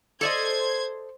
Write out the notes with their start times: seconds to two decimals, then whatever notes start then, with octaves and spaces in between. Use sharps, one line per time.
0.21 A4 C5 D5 D#5 G#6